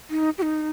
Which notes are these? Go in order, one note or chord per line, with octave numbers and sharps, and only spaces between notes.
D#4
G4
D#4